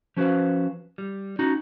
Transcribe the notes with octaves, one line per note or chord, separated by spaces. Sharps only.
F3 C#4 F#4 B4 C5 F5
G3
C#4 D#4 F#4